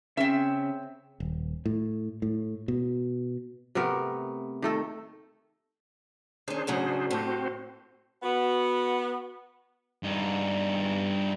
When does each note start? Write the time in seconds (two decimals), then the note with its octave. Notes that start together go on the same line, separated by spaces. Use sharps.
0.17 C#3 C4 C#4 G#4 E5
1.20 D#1
1.66 A2
2.22 A2
2.68 B2
3.75 C3 A3 B3 A#4
4.62 D#3 A3 A4
6.48 D#3 C#4 D4 G#4 C5
6.67 A2 C#3 F#3
7.11 A2 C4 F#4 G4 C5
8.23 B3 F#4
10.03 G2 D#4